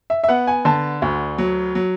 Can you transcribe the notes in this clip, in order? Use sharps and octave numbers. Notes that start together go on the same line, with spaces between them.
E5
E5
B3 F#5
G#5
D3 A5
D2
F#3
F#3